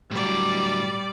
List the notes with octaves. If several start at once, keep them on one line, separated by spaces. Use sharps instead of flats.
A2 F#3 G3 D5